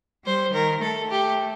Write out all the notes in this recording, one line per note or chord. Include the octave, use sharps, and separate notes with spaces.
G3 C5
D#3 A#4
A3 A4
G4